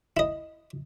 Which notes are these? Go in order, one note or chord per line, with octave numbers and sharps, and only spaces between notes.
E4 D#5